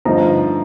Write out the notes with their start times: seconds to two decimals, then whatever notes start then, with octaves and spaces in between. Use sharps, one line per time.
0.05 G2 D3 F3 A3 D#4 A#5